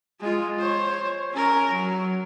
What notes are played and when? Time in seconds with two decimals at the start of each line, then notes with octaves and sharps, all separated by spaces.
0.20 G#3 F4
0.59 C5 C#5
1.32 C#4 A#4
1.71 F#3